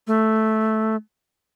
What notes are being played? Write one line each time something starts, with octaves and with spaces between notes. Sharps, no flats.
A3